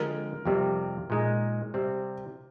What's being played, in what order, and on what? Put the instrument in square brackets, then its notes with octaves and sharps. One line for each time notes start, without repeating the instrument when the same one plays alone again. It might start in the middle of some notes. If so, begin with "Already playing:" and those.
Already playing: [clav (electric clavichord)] D3 F3 G#3 C4 F4 [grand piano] A#4
[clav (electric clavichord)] F2 C3 G3 C4
A#2 G#3 D#4
C3 G3 C4